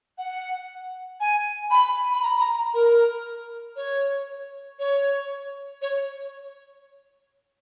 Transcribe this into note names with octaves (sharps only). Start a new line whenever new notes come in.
F#5
G#5
B5
B5
A#5
A#5
A#4
C#5
C#5
C#5